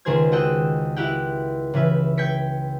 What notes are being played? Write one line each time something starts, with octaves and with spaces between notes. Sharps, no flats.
C#2 D#3 G#4 C5 G#6
F#4 A4 D#5 F#5 G5 E6
E4 F#4 G4 F#5 G5
C#3 E3 B4 E5
G5 G6 G#6 B6 C#7